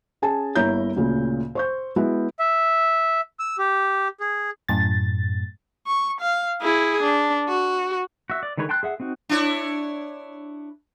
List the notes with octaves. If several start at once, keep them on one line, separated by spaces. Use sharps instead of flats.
C#4 G#4 G#5 A5
G1 A#3 E4 C#5 A#5 G6
D2 A#2 C#3
C5 C#6 G6
G#3 B3 E4 F#4
E5
E6
G4
G#4
F#2 A2 A6
C#6
F5
E4 G#4
D4
F#4
F#4 E5
D5
D3 D#3 G#3 B4 C#5
G5 A5 C6 F#6
G#4 E5 F#5
C4 D#4 F#4
D4 E4 C#5